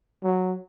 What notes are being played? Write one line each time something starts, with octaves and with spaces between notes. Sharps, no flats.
F#3